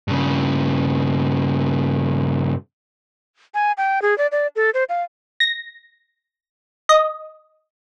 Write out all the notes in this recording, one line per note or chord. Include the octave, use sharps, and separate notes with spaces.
G2 C#3
G#5
G5
G#4
D5
D5
A4
C5
F5
A#6
D#5